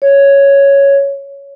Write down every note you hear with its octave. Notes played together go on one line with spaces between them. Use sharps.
C#5